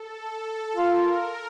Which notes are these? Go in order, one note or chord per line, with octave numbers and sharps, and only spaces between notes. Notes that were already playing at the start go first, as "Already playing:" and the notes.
Already playing: A4
A4
F4 A#4